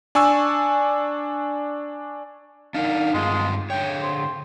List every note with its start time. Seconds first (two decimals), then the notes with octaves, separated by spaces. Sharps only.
0.15 D4 G#5 C#6 E6
2.74 D4 D#4 A#4 F5
3.14 G2 G#3 C4 F4
3.70 D3 C#5 G5
4.02 C5